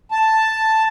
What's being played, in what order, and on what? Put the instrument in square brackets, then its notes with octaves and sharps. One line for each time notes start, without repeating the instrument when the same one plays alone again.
[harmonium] A5